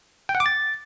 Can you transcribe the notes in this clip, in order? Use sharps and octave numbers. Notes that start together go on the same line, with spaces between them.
G5
F#5
D6
A6